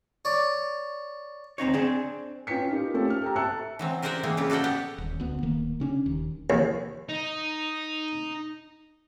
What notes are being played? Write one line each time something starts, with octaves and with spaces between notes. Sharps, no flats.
C#5 D5
D2 C4 D#4 C#5
C4 D4 G#4
C#4 F4 B4 G5 B6 C#7
D#4 F4 G4 A#4
A3 C4 C#4 F4 G4 A4
F6
G4 A4 G5 A#5
E5 A5 E6 F#6 C#7
E3 F#3 C4
G4 A#4 C5 D5 F#5 G5
E3 A#3 C4 G#4
C#3 C#4 F4 G4
F#4 A4 D5 F#5 G5
B3 G4 F#5
D#1
D2 B3
D1 D#3 A#3
C#3 C#4 D4
D#1 D#2
D#2
D#4